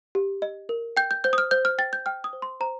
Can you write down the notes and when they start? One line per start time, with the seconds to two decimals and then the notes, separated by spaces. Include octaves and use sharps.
0.15 G4
0.42 D#5
0.69 A#4
0.97 G5 G6
1.11 G6
1.24 C5 G6
1.33 D#6
1.38 F6
1.51 C5 G6
1.65 F6
1.78 G5 A6
1.93 G6
2.06 G5 F6
2.24 D#6
2.33 C5
2.42 C6
2.60 C5 A#5